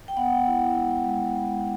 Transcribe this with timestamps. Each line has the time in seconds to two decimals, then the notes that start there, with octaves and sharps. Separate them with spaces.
0.08 G5
0.17 B3 F#5
0.47 E4
0.76 G#3
1.05 G#3
1.36 B3